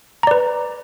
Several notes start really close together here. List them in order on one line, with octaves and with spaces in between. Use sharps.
A#5 D5 B4